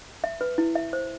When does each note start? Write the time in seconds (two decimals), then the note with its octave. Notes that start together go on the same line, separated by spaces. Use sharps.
0.24 E5
0.41 B4
0.58 E4
0.75 E5
0.93 C5